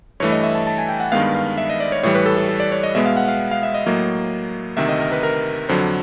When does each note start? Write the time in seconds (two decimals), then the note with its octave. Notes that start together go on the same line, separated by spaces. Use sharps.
0.20 G2 E3 A3 C#5
0.32 D#5
0.44 E5
0.55 A5
0.67 A5
0.78 G#5
0.89 G5
1.00 F#5
1.12 G2 D#3 G#3 B3 F5
1.35 F5
1.58 E5
1.70 D#5
1.80 D5
1.92 C#5
2.03 A2 E3 G3 C#5
2.15 B4
2.26 A4
2.37 A4
2.49 A4
2.60 D5
2.72 C#5
2.83 D#5
2.95 B2 G#3 B3 E5
3.06 F5
3.17 F#5
3.28 F5
3.51 F5
3.63 E5
3.74 D#5
3.86 A2 F#3 A#3
4.77 D2 C3 D#3 E5
4.89 D#5
5.00 A#4
5.12 B4
5.23 A#4
5.69 F2 D3 F#3 C5